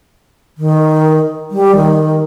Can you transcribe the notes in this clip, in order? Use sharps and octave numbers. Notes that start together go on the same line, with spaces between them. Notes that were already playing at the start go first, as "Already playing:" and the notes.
D#3
G3
D#3